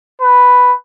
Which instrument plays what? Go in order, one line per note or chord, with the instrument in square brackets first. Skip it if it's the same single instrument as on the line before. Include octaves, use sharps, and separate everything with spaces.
[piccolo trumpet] B4